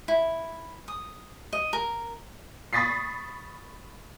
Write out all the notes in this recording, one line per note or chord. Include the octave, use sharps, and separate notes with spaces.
E4
D#6
D#5
A#4
B5 C#6 D#6 A6 B6 C7